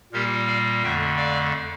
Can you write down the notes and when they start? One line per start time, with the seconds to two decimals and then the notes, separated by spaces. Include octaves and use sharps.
0.12 A#2 G3 A#3 G4 A#4
0.47 D5 F5
0.83 F2 D3 A3 E5 G5
1.17 D5 F5